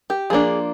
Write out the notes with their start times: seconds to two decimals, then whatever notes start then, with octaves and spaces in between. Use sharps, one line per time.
0.10 G4
0.30 F3 A#3 D4 G#4